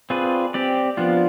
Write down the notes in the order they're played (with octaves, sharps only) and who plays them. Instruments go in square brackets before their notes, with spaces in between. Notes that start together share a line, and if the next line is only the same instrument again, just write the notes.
[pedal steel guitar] C4 F4 G#4 B4 D5
C4 G4 D5
F3 B3 D4 F4